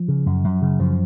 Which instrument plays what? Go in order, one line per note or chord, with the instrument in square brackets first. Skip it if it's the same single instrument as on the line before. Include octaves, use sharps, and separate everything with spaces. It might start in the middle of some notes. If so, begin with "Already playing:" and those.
Already playing: [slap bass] F3
C#3
F#2
F#2
C#3
F#2 F3